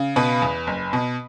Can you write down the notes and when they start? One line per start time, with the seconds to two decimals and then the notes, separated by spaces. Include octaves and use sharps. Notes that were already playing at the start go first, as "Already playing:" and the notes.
Already playing: C#3
0.16 B2 B4 B5
0.42 E2
0.67 F#1
0.93 B2